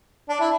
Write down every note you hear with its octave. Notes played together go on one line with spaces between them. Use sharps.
D4
E4